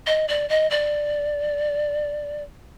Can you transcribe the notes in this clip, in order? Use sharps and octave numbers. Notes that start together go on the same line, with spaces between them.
D#5
D5
D#5
D5